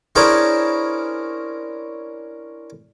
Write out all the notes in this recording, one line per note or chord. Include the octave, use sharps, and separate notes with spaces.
C#4 D4 E4 G#4 A#4 C5